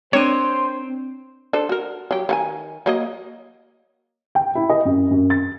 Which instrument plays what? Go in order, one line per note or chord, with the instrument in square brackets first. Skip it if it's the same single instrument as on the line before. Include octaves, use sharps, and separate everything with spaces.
[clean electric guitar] C4 [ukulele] D4 A#4 [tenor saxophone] C5 [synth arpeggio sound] C#5 D#7
[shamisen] D4 A4 C5
F#4 A#4
F#3 G4
D#3 F#5 G#5
F#3 A#3 D#5
[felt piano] G5
E4
D#5
F#2
F#2
A6